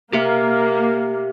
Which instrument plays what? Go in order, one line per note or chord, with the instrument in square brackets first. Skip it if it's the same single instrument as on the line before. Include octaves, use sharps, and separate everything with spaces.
[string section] A#3 [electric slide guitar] G4 E5